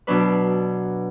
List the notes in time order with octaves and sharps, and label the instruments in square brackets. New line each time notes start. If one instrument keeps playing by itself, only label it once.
[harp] B2 F#3 D4 B4